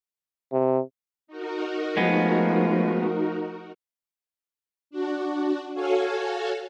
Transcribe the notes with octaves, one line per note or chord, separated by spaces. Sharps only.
C3
D#4 F#4 A#4
F3 G#3 A3 B3
D4 F#4
F#4 A4 C#5 F5 G#5